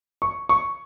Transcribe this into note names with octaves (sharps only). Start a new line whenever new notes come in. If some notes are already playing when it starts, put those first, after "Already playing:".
C#6
C#6